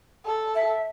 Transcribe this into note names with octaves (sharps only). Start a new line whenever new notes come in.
A4
E5